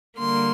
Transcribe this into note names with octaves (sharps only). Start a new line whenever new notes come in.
D3 G3 A#3 C6